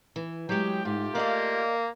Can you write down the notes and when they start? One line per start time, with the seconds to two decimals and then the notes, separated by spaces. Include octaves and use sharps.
0.16 E3
0.49 F#3 G#3 G4 G5
0.85 G#2 A3 F4 G4
1.15 A#3 D5 D#5 F5